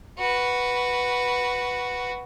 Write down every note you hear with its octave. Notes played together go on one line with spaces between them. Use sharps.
F#4 B4